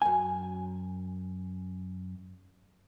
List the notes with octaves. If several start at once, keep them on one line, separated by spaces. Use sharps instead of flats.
F#2 G#5